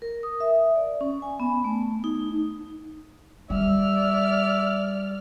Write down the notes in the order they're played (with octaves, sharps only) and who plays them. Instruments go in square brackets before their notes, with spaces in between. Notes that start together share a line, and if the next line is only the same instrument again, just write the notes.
[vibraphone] A#4
D#6
E5
D5
C#4
G#5
B3
A3
D#4
[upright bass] G3 [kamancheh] D5 F6 [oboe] E5